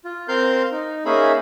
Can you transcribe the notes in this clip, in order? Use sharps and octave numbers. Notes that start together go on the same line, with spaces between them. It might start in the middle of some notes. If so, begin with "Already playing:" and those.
F4
C4 A#4 F5 C6 G6
D#4
A#3 C#4 D#4 G#4 E5 B5